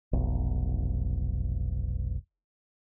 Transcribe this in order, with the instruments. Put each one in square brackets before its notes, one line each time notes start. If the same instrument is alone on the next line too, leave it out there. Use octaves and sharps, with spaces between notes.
[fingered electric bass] F1 B1